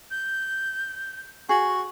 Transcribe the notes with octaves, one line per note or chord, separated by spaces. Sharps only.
G6
F#4 G#4